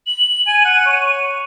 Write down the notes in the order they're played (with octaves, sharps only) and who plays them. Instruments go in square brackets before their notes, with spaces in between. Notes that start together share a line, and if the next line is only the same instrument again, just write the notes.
[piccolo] F#7
[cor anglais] G#5 [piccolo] D#7
[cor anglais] F#5
C#5